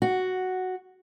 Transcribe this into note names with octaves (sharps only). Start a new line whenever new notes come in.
F#4